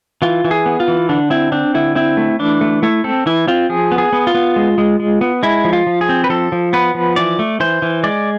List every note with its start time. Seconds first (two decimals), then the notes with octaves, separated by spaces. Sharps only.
0.22 E3 F4
0.45 E3
0.51 G#4
0.66 B3
0.80 F4
0.88 E3
1.09 D3 D4
1.30 C4 E4
1.52 C4 D4
1.74 D3 E4
1.95 C4 E4
2.17 A3
2.39 E3 D4
2.61 A3
2.83 A3 E4
3.04 C4 A4
3.26 E3 E4
3.48 C4 F4
3.69 F3 G#4
3.92 B3
3.98 G#4
4.13 B3
4.27 F4
4.35 B3
4.56 G#3
4.78 G#3
5.00 G#3
5.21 B3
5.43 G#3 E4
5.65 F3
5.73 F4
5.87 F3
6.01 G#4
6.09 C4
6.24 B4
6.29 F3 A4
6.52 F3
6.73 B3 B4
6.95 F3
7.16 E3 D5
7.39 A3
7.60 E3 C5
7.82 E3
8.04 G#3 D5